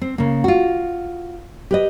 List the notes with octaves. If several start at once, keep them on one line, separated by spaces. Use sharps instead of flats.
C4
C#3 A#3
F4 F#4
G4 B4 D#5